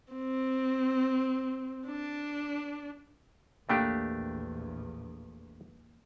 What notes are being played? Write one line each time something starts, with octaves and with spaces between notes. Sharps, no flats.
C4
D4
A#1 E2 A3 A#3 D4 G4 G5 B5